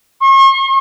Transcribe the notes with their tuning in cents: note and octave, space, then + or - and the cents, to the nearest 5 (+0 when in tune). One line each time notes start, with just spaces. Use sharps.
C#6 -45